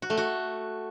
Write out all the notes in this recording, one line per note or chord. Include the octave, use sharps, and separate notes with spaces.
F#4
A3
F#4